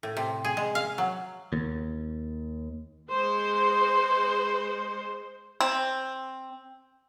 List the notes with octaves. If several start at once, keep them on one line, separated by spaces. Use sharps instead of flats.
A2
C3
G#4
G#3
F5
F#3
D#2
G#3 C5
C4